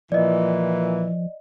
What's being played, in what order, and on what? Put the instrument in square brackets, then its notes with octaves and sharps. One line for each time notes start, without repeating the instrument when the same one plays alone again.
[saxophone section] A#2 E3 [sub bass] F3 [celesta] D5 D#5